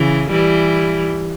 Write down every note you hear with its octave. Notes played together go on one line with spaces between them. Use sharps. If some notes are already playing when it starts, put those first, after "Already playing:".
Already playing: C#3 E3
E3 G3